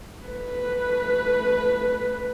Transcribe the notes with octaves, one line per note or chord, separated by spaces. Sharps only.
A3 B4